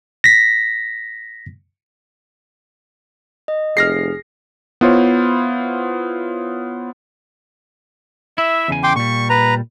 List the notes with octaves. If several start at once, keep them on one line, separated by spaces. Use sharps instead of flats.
A#6 B6
D#5
F1 G#4 F6 A#6 C7
B3 E4 F4 C5 C#5
E4 E5
E2 C#3 G#5
G5 C6 D6
A#2 G3 C#6
B4 A#5